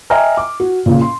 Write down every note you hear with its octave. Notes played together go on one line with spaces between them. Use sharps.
D#5 E5 G5 G#5 A#5 F6
D6
F#4
A#2 C#3
C6